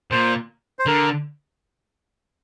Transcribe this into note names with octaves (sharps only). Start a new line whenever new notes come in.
A#2 C5
C5
D3 A#4